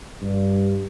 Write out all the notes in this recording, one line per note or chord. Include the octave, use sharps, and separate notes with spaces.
G2